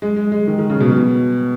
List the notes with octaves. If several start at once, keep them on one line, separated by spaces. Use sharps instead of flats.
G#3
G#3
G#3
D#3
D#3
C#3
B2
B2